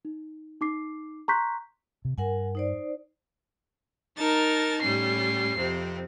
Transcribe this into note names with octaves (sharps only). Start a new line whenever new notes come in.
D#4
D#4 D6 C7
A#5 C6 C#6 F#6 G6 B6
C3
G2 A#4 F#5 G#5
D#4 C5 D5
D#4 A#4 A5 A6
A2 G3 C#4 C7
F2 C3 C4